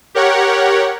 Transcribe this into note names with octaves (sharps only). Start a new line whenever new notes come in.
G4 A#4 C#5 F#5